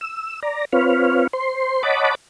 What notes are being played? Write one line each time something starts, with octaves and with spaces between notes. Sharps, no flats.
E6
D5 A#5
C4 F4 B4 C#5 F5
C5 C6
C#5 D#5 F#5 A5 B5 D6